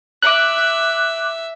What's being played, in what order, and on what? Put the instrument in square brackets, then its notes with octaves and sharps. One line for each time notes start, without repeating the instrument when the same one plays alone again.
[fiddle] E5 [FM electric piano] D6 F#6